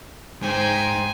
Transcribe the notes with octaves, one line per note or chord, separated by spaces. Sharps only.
G#2 G#3 C5 G5 G#5